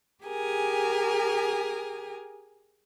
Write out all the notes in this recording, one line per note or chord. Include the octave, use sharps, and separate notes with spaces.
G4 G#4 A#4 G#5